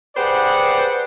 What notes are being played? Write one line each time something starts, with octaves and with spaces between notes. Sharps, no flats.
G4 G#4 B4 C5 D5 F#5